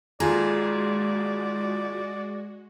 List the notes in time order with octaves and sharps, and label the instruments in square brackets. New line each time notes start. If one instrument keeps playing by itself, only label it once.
[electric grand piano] D#2 F4 A#5 [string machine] G#3 F#4 [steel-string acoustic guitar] G#4 [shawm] D5